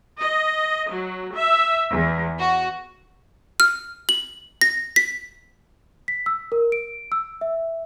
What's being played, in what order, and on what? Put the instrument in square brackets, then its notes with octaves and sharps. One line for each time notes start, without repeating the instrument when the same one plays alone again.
[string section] D#5
F#3
E5
E2
F#4
[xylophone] F6
F#7
A#6
B6
[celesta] B6
E6
A#4
D7
E6
E5